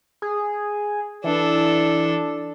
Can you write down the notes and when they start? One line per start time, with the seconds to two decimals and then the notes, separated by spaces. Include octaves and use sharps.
0.22 G#4
1.24 E3 D4 A4